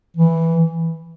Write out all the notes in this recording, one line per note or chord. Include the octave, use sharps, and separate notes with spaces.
E3